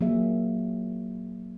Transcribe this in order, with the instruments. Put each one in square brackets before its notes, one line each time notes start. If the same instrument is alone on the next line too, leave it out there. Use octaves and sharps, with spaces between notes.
[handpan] F#3 A#3 G#4 E5